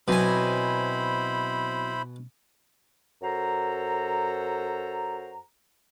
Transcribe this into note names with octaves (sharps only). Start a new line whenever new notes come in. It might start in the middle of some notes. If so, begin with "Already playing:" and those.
B2 F#3 C4 E4 C5 G#5 B5
F#2 F#4 A4 C5 A#5